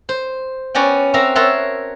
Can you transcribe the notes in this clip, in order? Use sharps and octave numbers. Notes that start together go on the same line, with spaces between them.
C5
B3 C#4 F#4 D5 G5
C4 F#4 A#4 E5 A#5
A#4 C#5 E5 F#5 A5 C6